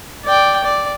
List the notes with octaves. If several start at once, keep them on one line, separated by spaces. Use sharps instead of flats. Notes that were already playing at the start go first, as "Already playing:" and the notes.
D5 G5
D5